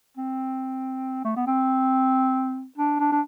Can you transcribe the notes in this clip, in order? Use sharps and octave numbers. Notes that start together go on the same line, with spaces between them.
C4
A3
B3
C4
D4
D4
D4